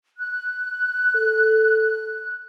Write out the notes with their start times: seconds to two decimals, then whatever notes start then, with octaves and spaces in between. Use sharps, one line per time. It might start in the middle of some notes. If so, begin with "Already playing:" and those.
0.18 F#6
1.15 A4